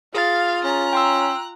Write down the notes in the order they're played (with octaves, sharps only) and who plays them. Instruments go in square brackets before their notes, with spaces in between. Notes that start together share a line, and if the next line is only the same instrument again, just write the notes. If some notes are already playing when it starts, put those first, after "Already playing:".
[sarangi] F4 [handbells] G#4 A6 [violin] F5
[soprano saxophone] C#4 [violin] A#5 F#6
[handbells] G5 C6 E6